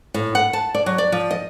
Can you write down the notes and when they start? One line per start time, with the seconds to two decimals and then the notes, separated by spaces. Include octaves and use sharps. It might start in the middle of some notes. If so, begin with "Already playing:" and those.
0.14 A2
0.35 F#5
0.53 A5
0.74 D5
0.86 F#3
0.98 D5
1.12 F3
1.31 D#5